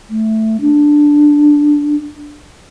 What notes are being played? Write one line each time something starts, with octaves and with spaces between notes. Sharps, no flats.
A3
D4